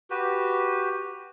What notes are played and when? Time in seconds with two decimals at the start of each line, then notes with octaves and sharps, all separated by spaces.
0.10 F#4 G4 B4